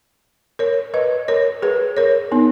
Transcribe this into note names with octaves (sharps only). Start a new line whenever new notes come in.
A#4 C#5
B4 D#5
A#4 C#5
G#4 B4
A#4 C#5
B3 D#4